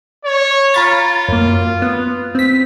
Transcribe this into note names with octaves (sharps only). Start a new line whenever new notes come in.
C#5
F4 A#5 B5 A6
F#2 A#3
B3
C4 B6